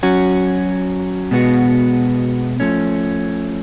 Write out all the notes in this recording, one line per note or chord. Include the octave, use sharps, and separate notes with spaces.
F#3 C#4 F#4
B2 G#3 B3 F#4
F3 A3 C#4